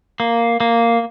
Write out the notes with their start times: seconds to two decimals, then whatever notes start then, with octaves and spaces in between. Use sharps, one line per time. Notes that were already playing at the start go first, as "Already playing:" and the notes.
0.20 A#3
0.60 A#3